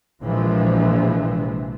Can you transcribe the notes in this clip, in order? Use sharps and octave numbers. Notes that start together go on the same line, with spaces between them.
A#1 C3 E3 F3 G#3